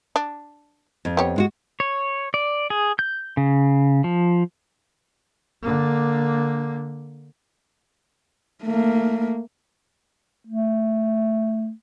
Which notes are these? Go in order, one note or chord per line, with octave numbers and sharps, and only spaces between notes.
D4
F2
B3 G4 C#5
G#3 F4 F#4
C#5
D5
G#4
G6
C#3
F3
D3 A#3
A3 A#3
A3